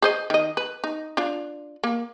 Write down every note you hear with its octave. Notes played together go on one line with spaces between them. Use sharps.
G#4 C5 D#5
D#3 D#5
B4
D#4
D4 F4
A#3